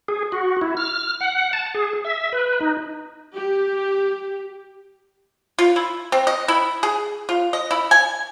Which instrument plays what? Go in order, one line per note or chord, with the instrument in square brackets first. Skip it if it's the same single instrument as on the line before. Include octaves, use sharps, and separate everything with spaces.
[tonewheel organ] G#4
F#4
E4
F6
F#5
A5
G#4
E5
B4
D#4
[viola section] G4
[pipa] F4
E4
C4
D#5
E4
G#4
F4
D#5
E4
G#5